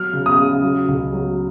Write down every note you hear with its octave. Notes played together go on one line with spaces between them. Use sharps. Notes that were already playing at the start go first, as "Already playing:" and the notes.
Already playing: F#3 F6
C#3
D#6
C#3
F#3
C#2
F#3